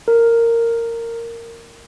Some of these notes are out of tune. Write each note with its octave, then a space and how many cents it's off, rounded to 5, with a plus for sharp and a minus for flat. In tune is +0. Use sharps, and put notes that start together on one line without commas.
A#4 -15